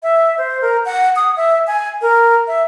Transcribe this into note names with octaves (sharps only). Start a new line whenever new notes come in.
E5
C5
A#4
F#5
D#6
E5
G#5
A#4
E5